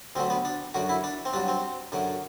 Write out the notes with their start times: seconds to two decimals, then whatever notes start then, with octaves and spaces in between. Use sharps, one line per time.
0.15 D2 D3 F#3 C4
0.30 B3
0.45 D4
0.74 F#2 D3 F#3 F#4
0.89 E4
1.04 D4
1.25 C4
1.33 G2 F#3 D4
1.48 C4
1.92 F#2 D3 F#3